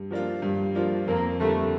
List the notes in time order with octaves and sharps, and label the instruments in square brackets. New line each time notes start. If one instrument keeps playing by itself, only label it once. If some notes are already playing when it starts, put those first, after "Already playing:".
Already playing: [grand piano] G2
F3 A#3 D4 F4
G2
F3 A#3 D4 F4
[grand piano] F2 [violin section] A#3
[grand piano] D3 G3 A#3 [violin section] A3